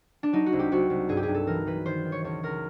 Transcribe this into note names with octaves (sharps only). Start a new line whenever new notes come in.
D4
F#3 D#4
F#4
C2
G4
C2 F#4
C2
G2 G#4
G4
G#4
G2
A4
E3 A#4
E3 B4
D#3 C5
D#3
C#5
C#2 C#5
C#2 A#4